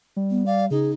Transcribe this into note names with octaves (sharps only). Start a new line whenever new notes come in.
G3
B3
D5 F5
C#3 D#4 G#4